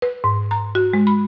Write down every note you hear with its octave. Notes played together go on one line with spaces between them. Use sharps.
B4
G#2
A#5
F#4
G#3
B5